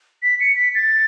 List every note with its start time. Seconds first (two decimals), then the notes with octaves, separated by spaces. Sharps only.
0.23 B6
0.40 C#7
0.56 B6
0.75 A6